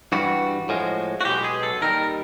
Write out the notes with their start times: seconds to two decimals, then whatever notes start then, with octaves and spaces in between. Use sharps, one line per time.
0.12 G2 E3 G3 F#4
0.69 A2 F3 G#3
1.21 F#4
1.25 B1 B2 G#3 G4
1.44 G#4
1.63 A4
1.82 D#2 D#3 G3 A#4